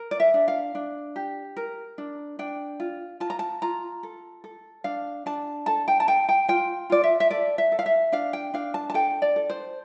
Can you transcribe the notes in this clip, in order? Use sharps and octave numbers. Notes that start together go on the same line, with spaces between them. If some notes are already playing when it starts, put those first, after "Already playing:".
Already playing: A#4
D5
E5
D4
F5
D4
G4
A#4
D4
D4 G5
F4
F4 A5
A#5
A5
F4 A#5
A4
A4
D4 F5
D4 A5
A4 A5
G5
A5
A4 G5
G5
F4 G5
F4 D5
E5
E5
A4 D5
E5
A4
F5
E5
D4 F5
G5
D4 F5
A5
A5
A4 G5
D5
A4
C5